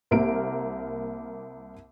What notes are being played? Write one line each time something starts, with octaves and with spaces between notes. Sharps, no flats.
C2 A#3 A#4 D7